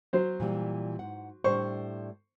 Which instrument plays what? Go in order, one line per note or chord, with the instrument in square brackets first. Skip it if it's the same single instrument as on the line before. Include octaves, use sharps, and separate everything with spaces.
[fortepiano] F#3 C5
[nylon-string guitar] A#2 E3 G3
G#2 F#5
[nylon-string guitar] A2 G3 D4 [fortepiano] C5 C#6